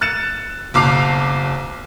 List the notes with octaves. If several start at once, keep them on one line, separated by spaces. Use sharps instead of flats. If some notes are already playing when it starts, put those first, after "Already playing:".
F#6 A6 C#7 E7
F#1 B1 D6 C7 F7